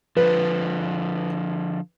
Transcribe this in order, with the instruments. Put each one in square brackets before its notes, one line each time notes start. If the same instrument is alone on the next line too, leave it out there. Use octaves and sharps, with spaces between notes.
[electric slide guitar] D3 F3 [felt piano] B4